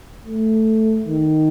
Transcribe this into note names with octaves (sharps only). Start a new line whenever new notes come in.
A3
D#3